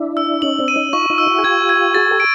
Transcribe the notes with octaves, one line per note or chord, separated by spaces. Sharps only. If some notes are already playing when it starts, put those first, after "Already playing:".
Already playing: D4 E4
E6
C#4 D#4 F#7
C4 D4
D#7
C#4 D#4
D#4 F4 C#6
D#4 F4
E6
E4 F#4
G#4
F4 G4 G#6
G#6
F#4 G#4 A6
G4 A4
D7